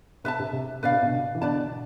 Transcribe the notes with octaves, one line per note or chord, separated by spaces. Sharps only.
C3 B4 E5 A5
C3
C3
B2 D3 B4 D5 F5
C3
B2 D3
E3
B2 D3 B4 D5 A5